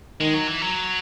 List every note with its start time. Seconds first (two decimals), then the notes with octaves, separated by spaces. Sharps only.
0.20 D#3 G#3
0.34 F#3
0.47 E3
0.61 F#3